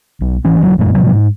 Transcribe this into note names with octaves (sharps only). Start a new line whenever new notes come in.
B1
G#1 E3 C#4
E1 F#3
E1 F#2 A#2 G#3
A2 C3 F3 F#3
G#2